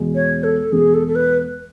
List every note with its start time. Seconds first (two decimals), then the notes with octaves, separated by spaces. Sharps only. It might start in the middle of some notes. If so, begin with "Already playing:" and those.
Already playing: E2 B2 G#3
0.15 C#5
0.44 A4
0.72 E2 B2 G#3 G#4
0.94 A4
1.07 A4
1.15 B4